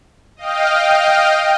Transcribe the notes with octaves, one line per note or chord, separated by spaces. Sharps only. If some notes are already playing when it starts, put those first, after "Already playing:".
D#5 F5 G5